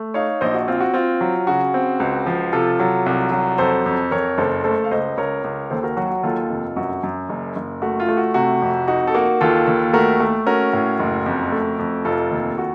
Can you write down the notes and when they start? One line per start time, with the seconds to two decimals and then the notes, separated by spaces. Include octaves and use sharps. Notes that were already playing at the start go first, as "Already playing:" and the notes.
Already playing: A3
0.14 D#4 C#5 F5
0.41 A#1 C5 D#5
0.54 F#4
0.68 C4 F4
0.80 F#4
0.94 C4 F4
1.21 F#3
1.47 C#3 F#4
1.74 C4
2.00 C#2
2.26 F3
2.53 C3 F4 A4
2.79 F#3
3.06 C2
3.32 F#3
3.58 F2 A4 C5
3.86 F2
4.11 F2 A#4 C#5
4.38 F#1 A4 C5
4.64 A3 A4 C5
4.84 F5
4.91 C#2 C5 D#5
5.17 C#2 A#4 C#5
5.44 C#2
5.70 D#2 A4 C5
5.83 F#4 A#4
5.97 F#3 F#4
6.11 F#4
6.23 D#2 F4 A4
6.49 F1
6.76 F#2 F#4
7.03 F#2
7.29 F#1
7.56 F#1
7.82 A3 F#4
8.00 F4
8.09 A3
8.17 F#4
8.34 C3 F#4
8.62 F2
8.87 D#4 F#4
9.07 A4
9.14 A#3 F#4
9.41 D#2 F4 A4
9.67 D#2
9.93 A3 F#4 A#4
10.20 A3
10.47 C#4 F#4 A#4
10.73 A2
10.99 F#1
11.26 F2
11.52 A3
11.79 F2
12.05 F1 F4 A4
12.31 D#2
12.58 F#4